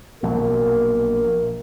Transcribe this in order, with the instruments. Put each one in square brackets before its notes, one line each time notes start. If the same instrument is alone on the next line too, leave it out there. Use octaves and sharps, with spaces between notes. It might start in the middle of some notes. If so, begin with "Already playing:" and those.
[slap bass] A#1 B2 F#3 [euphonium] A#4